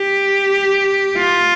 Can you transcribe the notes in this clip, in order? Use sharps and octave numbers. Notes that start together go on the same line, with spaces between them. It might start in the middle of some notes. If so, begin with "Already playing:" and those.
Already playing: G4
F4